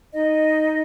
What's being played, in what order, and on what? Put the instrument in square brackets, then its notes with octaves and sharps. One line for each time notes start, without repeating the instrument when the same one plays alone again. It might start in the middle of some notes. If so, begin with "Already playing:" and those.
[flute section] D#4 D#5